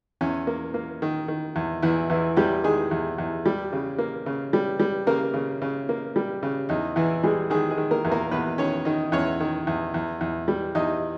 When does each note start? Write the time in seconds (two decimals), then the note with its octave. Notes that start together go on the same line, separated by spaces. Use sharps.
0.21 E2 C#4
0.47 A#3
0.74 A#3
1.02 D#3
1.28 D#3
1.56 E2
1.82 E2 E3 E4
2.10 E2 E3 E4
2.37 E2 G3 G4
2.64 D#3 G#3 G#4
2.91 E2
3.18 E2
3.46 G3
3.73 C#3
3.98 A#3
4.26 C#3
4.53 G3
4.80 G3
5.07 C#3 A#3 A#4
5.34 C#3
5.62 C#3
5.89 A#3
6.16 G3
6.43 C#3
6.69 E2 D#4
6.96 E2 E3 E4
7.23 G3 G#3 G#4
7.50 D#3 G#3 G#4
7.71 G#3 G#4
7.78 D#3
7.91 A#3 A#4
8.05 E2
8.11 A#3 A#4
8.31 E2 B3 B4
8.58 D#3 C#4 C#5
8.85 D#3 D#4 D#5
9.12 E2 C#4 C#5
9.40 D#3
9.67 E2
9.94 E2
10.21 E2
10.48 G3
10.75 E2 D#4 D#5